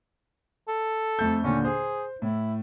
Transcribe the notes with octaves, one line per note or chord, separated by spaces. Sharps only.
A4
F2 A3 G6
D#2 A#2 D3 C#4
G#4 C5
A2 E4